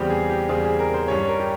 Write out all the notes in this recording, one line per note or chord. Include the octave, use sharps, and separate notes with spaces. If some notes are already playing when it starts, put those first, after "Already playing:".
Already playing: E2 C#3 G3 C4 G4
G#4
G4
E2 C#3 G3 C4 G#4
G#4
A#4
C5
G2 G3 C#4 C#5
A#4
G4